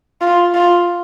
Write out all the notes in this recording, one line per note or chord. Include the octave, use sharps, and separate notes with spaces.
F4
F4